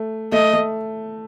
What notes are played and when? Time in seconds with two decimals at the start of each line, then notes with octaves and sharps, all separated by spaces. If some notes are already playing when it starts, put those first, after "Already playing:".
Already playing: A3
0.32 A3 D#5
0.53 A3